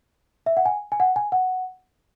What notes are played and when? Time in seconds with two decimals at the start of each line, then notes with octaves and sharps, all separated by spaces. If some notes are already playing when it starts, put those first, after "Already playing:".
0.46 E5
0.57 F#5
0.66 G#5
0.92 G#5
1.00 F#5
1.16 G#5
1.32 F#5